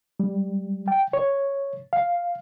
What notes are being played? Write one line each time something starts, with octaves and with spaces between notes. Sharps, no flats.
G3
G5
C#5
F5